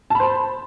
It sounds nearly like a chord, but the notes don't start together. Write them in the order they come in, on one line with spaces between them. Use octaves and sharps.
A5 B5 C5